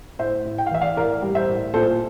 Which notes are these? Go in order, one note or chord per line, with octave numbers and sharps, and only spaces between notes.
A2 C5 E5
A2
G5
F5
E3 E5
D5 F5
A2 A#4 D5
G3
C5 E5
A2
A#2 A4 C5